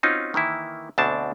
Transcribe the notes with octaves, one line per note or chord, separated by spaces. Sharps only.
C4 C#4 D#4 F4 F#4
D#3 E3 A#3 E4
D2 B2 C4 D4 F#5 A5